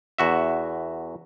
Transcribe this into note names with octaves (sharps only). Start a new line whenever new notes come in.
E2 F#4 E5